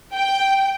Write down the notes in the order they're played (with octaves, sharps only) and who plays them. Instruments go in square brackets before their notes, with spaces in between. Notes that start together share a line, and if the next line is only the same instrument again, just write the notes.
[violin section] G5